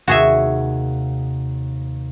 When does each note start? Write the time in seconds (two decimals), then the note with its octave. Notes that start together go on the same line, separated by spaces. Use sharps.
0.08 D#2 C3 F#4 G#4 E5